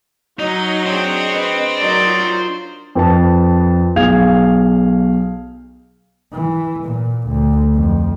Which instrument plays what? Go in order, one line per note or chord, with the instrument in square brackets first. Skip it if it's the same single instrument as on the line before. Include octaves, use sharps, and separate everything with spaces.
[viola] F#3 [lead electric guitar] D#4 [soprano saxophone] D#5
[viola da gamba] D4 G#4 C#5 [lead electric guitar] C5 G5
[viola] B4
[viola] F#3 D5 [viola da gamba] D4 D#4 A#4
[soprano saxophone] F4
[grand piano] F2 B4 A5
B1 G#4 F5 G#6 F7
[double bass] E3
A#2
D2
F2